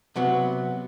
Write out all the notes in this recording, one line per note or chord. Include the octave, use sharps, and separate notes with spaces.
C3 F#3 B3